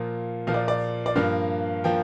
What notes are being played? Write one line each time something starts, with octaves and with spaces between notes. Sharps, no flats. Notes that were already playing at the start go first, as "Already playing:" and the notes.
Already playing: A#2 F3 A#3
A#2 F3 A#3 F5
D5
D5
D5
G2 F3 A#3 F5
F3 A#3 G5